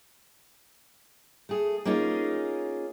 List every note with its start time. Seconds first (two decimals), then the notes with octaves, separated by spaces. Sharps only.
1.49 A3 G#4
1.85 A#3 C#4 D#4 F4 G#4